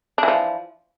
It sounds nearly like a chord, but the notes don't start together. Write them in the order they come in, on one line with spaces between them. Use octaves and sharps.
D4 E3 F3